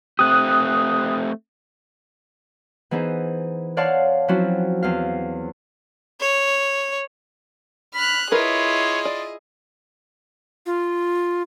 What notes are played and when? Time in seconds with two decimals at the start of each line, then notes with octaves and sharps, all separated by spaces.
0.19 A3 C4 G4 D#6 F#6
2.91 E3 B3 D#4 G#4 C5
3.77 C#5 D5 F5 F#5 A5 C6
4.28 F3 F#3 C4 C#4 E4 F#4
4.83 E2 C4 F5
6.21 C#5
7.95 B5 F6 F#6
8.32 E4 F4 G#4 A#4 B4 C#5 D#5
9.05 D5
10.66 F4